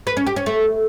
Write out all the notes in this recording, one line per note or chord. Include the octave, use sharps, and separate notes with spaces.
B4
C#4
G4
C#4
A3